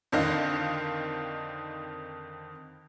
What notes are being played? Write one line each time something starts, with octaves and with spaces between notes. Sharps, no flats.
F2 D3 D#3 D#5 F5